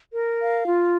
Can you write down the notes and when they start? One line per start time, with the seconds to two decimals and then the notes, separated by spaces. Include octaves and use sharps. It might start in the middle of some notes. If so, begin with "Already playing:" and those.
0.13 A#4
0.39 F5
0.66 F4